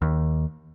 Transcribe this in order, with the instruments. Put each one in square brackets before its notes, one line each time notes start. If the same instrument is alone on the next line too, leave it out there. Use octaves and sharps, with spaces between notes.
[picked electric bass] D#2